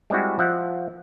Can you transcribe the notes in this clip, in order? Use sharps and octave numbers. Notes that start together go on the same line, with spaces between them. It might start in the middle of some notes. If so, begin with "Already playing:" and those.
G3 G#3 C4 E4 F#4
F3 E5 F#5